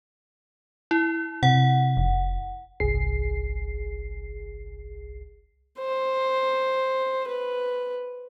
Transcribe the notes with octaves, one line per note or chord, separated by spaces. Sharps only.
E4
C3 F#5
F1
G1 C2 G#4 C7
C5
B4